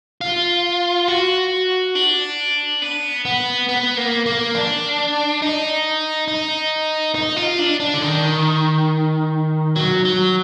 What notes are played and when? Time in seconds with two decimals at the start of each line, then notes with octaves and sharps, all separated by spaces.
0.21 F4
1.08 F#4
1.95 D4
2.82 B3
3.25 B3
3.69 B3
3.97 A#3
4.26 A#3
4.55 D4
5.42 D#4
6.28 D#4
7.15 D#4
7.36 F4
7.59 D4
7.80 D4
7.94 D3
8.02 D#3
9.76 F#3
10.05 F#3